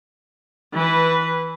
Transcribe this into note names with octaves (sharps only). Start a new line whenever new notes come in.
E3 B4